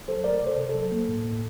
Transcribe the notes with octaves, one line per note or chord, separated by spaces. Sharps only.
F#3 A4 C5
A3 A#4 D5
C3
A4 C5
C3
A4
F#3
A#3
A2
A2